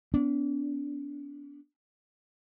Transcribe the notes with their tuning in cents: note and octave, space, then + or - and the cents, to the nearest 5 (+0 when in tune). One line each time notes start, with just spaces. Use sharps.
B3 +15 D4 -35